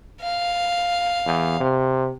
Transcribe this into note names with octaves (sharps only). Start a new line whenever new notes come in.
F5
E2
C3